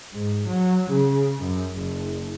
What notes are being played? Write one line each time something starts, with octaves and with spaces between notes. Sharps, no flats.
G#2
F#3
C#3
F#2
F#1